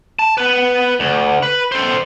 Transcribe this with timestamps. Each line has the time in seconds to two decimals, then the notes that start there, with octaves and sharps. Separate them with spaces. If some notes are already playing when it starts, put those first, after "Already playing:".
0.19 A5
0.38 B3 B4
1.00 D2
1.43 B4
1.72 A4 C5